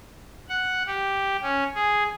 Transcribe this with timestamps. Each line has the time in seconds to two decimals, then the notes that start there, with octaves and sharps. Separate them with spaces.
0.49 F#5
0.87 G4
1.42 C#4
1.75 G#4